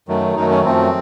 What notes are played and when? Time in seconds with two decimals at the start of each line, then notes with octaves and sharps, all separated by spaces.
0.08 F#2 D#3 F#3 A3
0.36 F#2 D#3 F#3 A3 D#4
0.50 C#4
0.65 F#2 F3 A3 C4